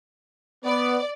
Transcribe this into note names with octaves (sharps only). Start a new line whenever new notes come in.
B3 D5